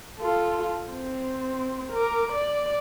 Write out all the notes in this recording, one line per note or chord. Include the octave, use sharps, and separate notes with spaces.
F4 A4
C4
A#4 D6
D5